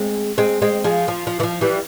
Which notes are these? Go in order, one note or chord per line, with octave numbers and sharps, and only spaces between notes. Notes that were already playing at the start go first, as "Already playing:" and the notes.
Already playing: G#3 C4
G#3 C4
G#3 C4
F3 G#3
F3
F3
E3
F3
E3 G3